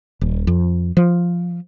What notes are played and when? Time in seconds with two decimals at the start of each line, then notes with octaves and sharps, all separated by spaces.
0.21 D#1
0.47 F2
0.97 F3